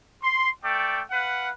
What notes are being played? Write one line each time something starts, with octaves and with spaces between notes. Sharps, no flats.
C6
A3 D5 G5
B4 F5 F#5